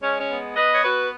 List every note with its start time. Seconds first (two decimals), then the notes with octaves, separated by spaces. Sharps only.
0.01 G#3 C#4
0.19 C#4
0.29 B3
0.56 B3 B4 D#5
0.72 C#5
0.83 B3 F#4 B4